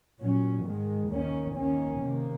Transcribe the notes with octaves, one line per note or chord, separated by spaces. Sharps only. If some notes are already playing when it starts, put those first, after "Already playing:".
A#2 F#3 C#4
G#2 D#3 G#3
D#2 D#3 A#3 C#4
D#2 D#3 A#3 C#4
C3 D#3 A#3